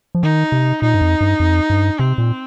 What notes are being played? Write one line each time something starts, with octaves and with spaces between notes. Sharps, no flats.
F3
D#3 D#4
C3
A#2 D#4
G2
F2
G2
F2
G2
C3 C4
A#2